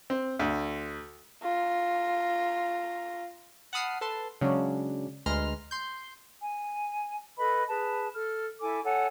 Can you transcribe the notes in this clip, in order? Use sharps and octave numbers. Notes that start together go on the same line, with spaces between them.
C4
D2
F4 A#5
F#5 A5 B5 D#6 F6 C7
A4 B4 A5 C6
C#3 F#3 G#3 C#4 D4
D2 G#3 B4 A#5 C6 F6
C6 G6
G#5
A4 B4 D#5 B5
G#4 B4 A5
A4 F6
E4 A4 G#5 D6
A4 C#5 F#5 G#5